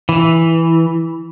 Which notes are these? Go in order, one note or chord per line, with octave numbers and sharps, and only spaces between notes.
E3